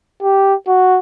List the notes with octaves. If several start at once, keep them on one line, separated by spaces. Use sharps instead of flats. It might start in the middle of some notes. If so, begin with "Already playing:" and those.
G4
F#4